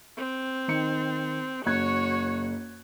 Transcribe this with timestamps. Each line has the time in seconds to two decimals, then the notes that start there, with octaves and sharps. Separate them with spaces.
0.17 C4
0.68 D#3 C#7
1.66 F#1 F#4 C#5 F#6 G#6